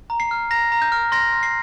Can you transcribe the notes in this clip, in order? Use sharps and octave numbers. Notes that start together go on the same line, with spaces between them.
A#5
C7
F6
A#5 A#6
A#5
G6
F6
C6 A#6
C6
C7